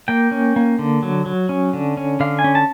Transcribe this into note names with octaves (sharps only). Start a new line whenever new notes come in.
A#3 G5
C#4
A#3
D3
F#3
F#3
C#4
D3
C#4
D3 F5
G#5
C#4
A5